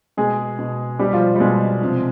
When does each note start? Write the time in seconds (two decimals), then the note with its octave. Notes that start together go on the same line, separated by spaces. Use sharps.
0.17 B2 G#3 G#4
0.59 B2
0.99 B2 G3 G4
1.13 F3 F4
1.36 G3
1.40 B2 G#3
1.81 C3 F3